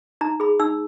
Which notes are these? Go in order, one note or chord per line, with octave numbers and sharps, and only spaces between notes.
D#4 A#5
G#4 B5
D#4 E6